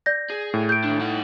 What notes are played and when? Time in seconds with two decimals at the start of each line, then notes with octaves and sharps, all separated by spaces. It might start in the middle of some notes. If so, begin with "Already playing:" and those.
0.06 D5 G6 A#6
0.30 G#4
0.54 A2
0.69 G6 D7
0.84 D#2 D4
1.01 D#4 F#5